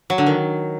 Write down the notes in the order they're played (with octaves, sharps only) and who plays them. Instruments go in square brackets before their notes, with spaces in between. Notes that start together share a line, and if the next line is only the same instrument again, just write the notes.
[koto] F#3
D3
D#3